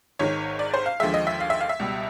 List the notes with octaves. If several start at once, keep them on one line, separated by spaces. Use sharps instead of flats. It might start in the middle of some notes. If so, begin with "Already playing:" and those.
G#1 G#2 D#3 C#5
D5
C5
F5
D#2 D3 F3 G#3 E5
D#5
E5
F5
E5
F5
E5
C#2 B2 G3